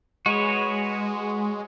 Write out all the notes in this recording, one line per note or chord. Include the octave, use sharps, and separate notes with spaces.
G#3 F#4 B4 C#5